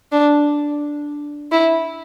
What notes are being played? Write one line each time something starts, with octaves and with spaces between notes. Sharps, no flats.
D4
E4